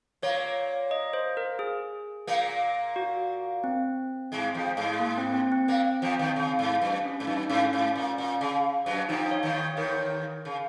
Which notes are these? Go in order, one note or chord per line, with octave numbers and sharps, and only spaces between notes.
A#2 A#3 C#5
D#5
C5
A#4
G#4
A#2 A#3
F#4
C4
G#2 G#3
F2 F3
G#2 G#3
A#3
C4
C4
C4
A#2 A#3
F2 F3
D#2 D#3
C#3
G#2
F#2
C#4
G#2
F#2 D#4
G#2 C#4
G#2
A#2
A#2
C#3
F#2 F#3
F2 F3 D#4
C#5
D#2 D#3
C#5
D#2 D#3 A#4
C#3